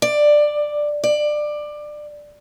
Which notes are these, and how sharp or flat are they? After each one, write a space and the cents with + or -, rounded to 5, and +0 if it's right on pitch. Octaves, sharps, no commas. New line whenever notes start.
D5 +10
D5 +20